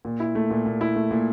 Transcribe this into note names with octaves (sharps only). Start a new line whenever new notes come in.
A#2
E4
A3
A#2
A#2
E4
A3
A#2